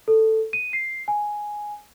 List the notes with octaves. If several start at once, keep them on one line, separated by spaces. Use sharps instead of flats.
A4
D#7
C7
G#5